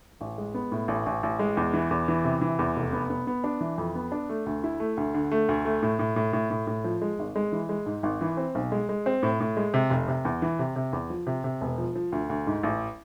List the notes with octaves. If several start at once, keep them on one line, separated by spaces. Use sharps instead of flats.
A1
G#3
B3
A2
A1
A1
A1
G#3
E2
E3
E2
E3
C3
E3
E2
F1
B3
B3
B3
D4
E3
F2
B3
D4
A3
D2
E4
A3
D2
D3
A3
D2
A3
A2
A2
A2
A2
A2
A2
F3
G#3
G#1
G#3
E3
G#3
G#2
G#1
E3
C4
B1
G#3
G#3
C4
A2
A2
G#3
C3
F1
C3
E2
E3
C3
C3
E2
F3
C3
C3
E1
F3
F3
D2
D2
G#2
A1